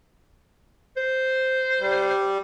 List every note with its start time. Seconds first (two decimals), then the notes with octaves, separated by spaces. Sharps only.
0.97 C5
1.80 G3